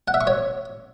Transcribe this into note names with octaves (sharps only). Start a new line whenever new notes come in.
F#5
E5
C#6
C#5